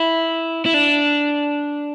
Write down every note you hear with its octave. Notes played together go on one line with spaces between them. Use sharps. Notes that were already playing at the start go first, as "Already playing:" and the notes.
Already playing: E4
E4
D4